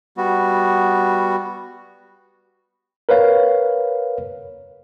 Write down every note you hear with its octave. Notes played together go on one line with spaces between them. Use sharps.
G3 B3 F#4
A#4 B4 C#5 F5